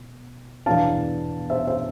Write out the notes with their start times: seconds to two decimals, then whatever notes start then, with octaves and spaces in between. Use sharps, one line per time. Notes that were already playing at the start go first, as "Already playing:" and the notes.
Already playing: B2
0.66 E2 B2 B3 D4 F5 A5
1.50 C5 E5
1.67 C5 E5